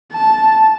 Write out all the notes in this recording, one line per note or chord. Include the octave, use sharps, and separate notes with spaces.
A5